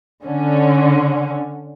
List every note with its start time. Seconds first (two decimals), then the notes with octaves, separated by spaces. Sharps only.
0.23 D3 C#4